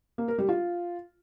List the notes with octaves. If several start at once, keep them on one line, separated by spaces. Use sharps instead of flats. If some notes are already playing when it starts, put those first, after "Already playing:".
A#3
A#4
G3
F4